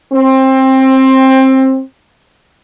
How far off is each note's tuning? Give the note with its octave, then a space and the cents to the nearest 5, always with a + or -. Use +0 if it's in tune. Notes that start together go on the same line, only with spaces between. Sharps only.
C4 +20